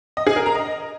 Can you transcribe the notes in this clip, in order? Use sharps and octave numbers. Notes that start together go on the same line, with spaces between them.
D#5
G#4
A#4
A#5
D#5